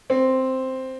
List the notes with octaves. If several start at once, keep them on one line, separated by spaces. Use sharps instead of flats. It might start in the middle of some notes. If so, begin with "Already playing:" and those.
C4